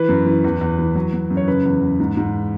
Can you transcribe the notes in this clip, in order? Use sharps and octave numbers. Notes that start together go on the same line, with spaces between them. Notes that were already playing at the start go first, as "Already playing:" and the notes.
Already playing: E3 B4
F#2
E3
E2
E2
E3
F#3
F#3
F#2
C#5
C#3 B4
E2
E2
G#2
G#2